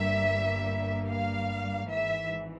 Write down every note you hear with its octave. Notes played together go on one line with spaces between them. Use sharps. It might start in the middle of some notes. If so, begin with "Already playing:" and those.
Already playing: G1 G2 G3 A#3 E5
F5
G#1 G#2 E3 E5